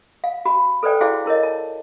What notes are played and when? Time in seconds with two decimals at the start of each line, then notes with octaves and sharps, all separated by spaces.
0.24 F5
0.45 F#4 B5
0.83 A4 B4 C5 D5 G5
1.01 E4 F#4 G#4 C5 D5 F5
1.26 E4 A#4 C#5 D#5
1.43 A5